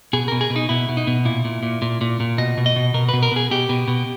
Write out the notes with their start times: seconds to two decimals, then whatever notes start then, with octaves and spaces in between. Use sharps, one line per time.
0.13 B2 G#4
0.28 B2 A#4
0.41 G#4
0.50 B2
0.56 D#4
0.69 B2 E4
0.89 B2
0.97 D#4
1.07 B2
1.25 A#2 E4
1.45 A#2
1.63 A#2
1.82 A#2
2.01 A#2
2.20 A#2
2.38 B2 D#5
2.57 B2
2.66 D#5
2.76 B2
2.94 B2 A#4
3.09 B2 B4
3.23 A#4
3.32 B2 G#4
3.51 B2 G4
3.69 B2
3.88 B2